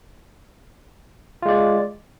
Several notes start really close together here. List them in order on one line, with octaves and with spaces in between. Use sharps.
F4 G#3 D5